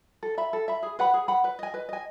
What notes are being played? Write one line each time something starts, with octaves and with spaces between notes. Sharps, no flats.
A4
E5 B5
A4
E5 B5
G#4
B4 F#5 B5
G#4
B4 F#5 B5
B4
D#5 G#5
B4
D#5 G#5